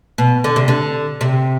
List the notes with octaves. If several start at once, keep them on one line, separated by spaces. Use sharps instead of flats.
B2
D3
C3
D3
C3